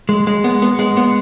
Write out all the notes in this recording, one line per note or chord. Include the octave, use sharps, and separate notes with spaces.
G#3
G#3
B3
B3
G#3
B3